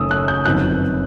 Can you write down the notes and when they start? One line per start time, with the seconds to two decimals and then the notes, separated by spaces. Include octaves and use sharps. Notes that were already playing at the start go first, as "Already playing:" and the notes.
Already playing: F#1 F#2 D#3 A3 D#6 E6
0.11 F#6
0.28 G6
0.45 G1 F#2 D#3 F#3 C4 F#6